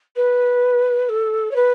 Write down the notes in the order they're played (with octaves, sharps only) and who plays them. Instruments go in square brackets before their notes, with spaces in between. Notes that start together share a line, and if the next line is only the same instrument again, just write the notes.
[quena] B4
A4
C#5
B4